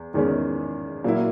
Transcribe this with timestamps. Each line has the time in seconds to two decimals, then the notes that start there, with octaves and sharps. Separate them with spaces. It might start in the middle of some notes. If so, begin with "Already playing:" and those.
Already playing: E2
0.14 E2 D#3 G#3 C#4
1.04 A#2 F#3 A#3 E4